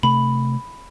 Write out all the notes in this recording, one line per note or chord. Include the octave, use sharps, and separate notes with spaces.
C3 A3 B5